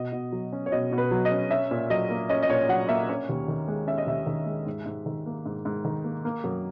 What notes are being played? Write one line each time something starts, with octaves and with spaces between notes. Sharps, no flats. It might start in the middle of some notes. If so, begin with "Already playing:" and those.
Already playing: B2 D#5
B2
F#3
C#4
C#5
B2 D#5
B2
B4
F#3
D#5
C#4
C#4 E5
A#2
F#3 D#5
A#3
C#4 D#5
D#5
A#2 C#5
F#3 F#5
A#3 E5
C#4 C#5
D#2
D#3
G#3
C#4 E5
D#5
D#2 E5
D#3
G#3
G#2
G#2
D#3
A#3
G#2
G#2
D#3
A#3
A#3
F#2